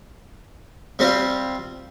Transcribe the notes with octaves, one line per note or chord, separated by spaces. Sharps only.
C3 G3 C4 F4